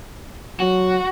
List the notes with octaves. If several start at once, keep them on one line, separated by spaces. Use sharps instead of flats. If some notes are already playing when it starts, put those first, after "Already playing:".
F#3 F#4